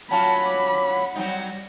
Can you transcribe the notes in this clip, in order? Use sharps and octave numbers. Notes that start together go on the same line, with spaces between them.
F#3 C#4 F4 A5 B5
D6
F#5
F#3 G3 C4 D#4